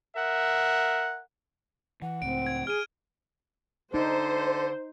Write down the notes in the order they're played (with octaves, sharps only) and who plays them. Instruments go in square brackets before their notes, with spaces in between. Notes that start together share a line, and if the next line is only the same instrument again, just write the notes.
[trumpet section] A#4 E5 F#5
[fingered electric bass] E3 [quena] F#5
[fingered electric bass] C#2 A2 [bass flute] C4 [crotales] D7
[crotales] G#6
[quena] G#4 [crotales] F6 D#7
[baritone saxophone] D3 [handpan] D#4 [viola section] C5